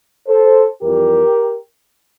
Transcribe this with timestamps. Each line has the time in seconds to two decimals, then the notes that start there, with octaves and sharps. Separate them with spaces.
0.28 A4 C5
0.82 F2 E3 G3 G4 A#4